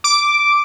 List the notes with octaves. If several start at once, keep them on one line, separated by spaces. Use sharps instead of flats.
D6